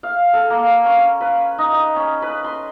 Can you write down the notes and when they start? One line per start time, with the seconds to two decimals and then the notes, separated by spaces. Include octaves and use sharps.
0.03 F5
0.33 A4
0.50 A#3
0.85 C#4
1.21 B4
1.58 D#4
1.72 D#5
1.96 C#4
2.22 B4
2.44 C6